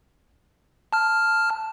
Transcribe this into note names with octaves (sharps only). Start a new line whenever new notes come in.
A5 F6